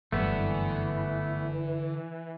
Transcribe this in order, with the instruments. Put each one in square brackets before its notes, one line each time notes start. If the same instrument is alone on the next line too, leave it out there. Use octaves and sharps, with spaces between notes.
[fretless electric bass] F#1 G2 [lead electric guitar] D3 D5 [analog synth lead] E3 [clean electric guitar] A3 B3